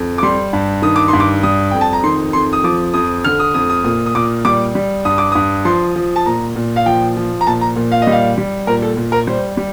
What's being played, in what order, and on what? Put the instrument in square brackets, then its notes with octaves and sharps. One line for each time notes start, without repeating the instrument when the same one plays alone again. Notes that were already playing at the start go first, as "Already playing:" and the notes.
Already playing: [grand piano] F2
D6
G3 C6
G2
D#3 D#6
D6
G2 C6
D6
G3 D#6
F2 G5
A5
A#5
D#3 C6
F2 C6
D#6
F3 D6
F2 D#6
D3 F6
D#6
F2 D#6
D#6
A#2 D#6
D#6
A#2 D6
G3 D6
G3
G2 D#6
D6
G2 D#6
F3 C6
F3
A5
A#2 A#5
A#2
F5
F3 G5
F3
A#5
A#2 A5
A#5
A#2
F5
D#5
G3
F5
G3
A#2 A#4
A4
A#2
A#4
G3 C5
G3